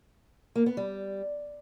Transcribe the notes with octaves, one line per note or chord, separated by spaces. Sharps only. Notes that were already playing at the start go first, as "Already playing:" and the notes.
A#3
B3
G3